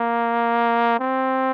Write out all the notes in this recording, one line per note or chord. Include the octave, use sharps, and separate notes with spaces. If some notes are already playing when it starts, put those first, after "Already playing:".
Already playing: A#3
C4